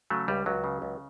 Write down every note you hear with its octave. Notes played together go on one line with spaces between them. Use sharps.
C#3 F#3 A3
C#2 G3
C#2 F#3
C#3
C#2